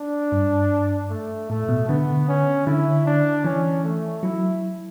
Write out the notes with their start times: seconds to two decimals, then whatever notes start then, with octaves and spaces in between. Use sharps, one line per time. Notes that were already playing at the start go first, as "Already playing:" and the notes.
Already playing: D4
0.32 G2
1.10 A3
1.50 A2 A3
1.69 B2
1.88 D3 B3
2.28 C#4
2.67 D3 E4
3.06 D4
3.45 E3 C#4
3.84 A3
4.23 F#3 E4